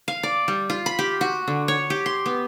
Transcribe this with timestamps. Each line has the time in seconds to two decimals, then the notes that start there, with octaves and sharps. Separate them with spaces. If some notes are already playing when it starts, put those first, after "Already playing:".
0.08 F5
0.23 D5
0.48 G3
0.70 F4
0.86 B5
0.99 G4
1.21 F#4
1.48 D3
1.68 C#5
1.90 G4
2.06 C6
2.26 B3